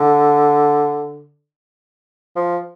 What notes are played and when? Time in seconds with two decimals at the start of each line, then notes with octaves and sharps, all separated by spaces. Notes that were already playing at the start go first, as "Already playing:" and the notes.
Already playing: D3
2.36 F3